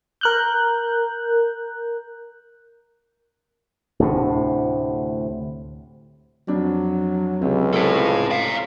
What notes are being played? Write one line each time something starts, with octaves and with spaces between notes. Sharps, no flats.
A#4 F#6 G6
D2 A2 C3
F2 F#3 D4
C#2 C3
C3 C4 E4 A4
D5 F5